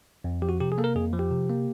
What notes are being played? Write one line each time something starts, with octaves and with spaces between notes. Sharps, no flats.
F2
F3 G4
F#4
C3 G4
G#4
A#3 A4
A#4
F2 G#4
F3
G4
C3
A#3